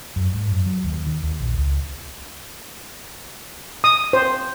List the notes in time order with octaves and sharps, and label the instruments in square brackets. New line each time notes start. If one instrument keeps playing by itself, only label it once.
[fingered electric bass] F#2
G#2
F#2
F#3
D#2
D#3
D#2
A#1
C#2
[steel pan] D#6
C5